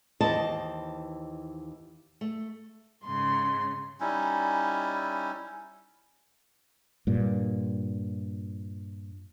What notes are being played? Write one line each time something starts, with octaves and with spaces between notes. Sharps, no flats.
D#2 E3 C5 D#5 A5
A3
G#2 C#3 C6
G3 C#4 D#4 E4
G2 A#2